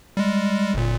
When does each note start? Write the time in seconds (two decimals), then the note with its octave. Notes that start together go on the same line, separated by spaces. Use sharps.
0.17 G3 G#3
0.74 G1 A#2